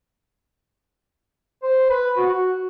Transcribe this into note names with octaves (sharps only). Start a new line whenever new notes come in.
C5
B4
F#4